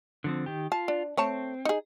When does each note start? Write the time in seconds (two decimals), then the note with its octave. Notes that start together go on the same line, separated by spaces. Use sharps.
0.24 D3 F3 C4
0.46 D#3 G4
0.72 F4 A5
0.88 D4
1.17 A3 C4 C#5 A5
1.65 D#4 G#4